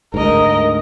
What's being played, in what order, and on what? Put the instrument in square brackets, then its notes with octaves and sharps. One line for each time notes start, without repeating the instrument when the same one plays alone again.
[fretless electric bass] D2 G#2 [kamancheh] A#4 D#5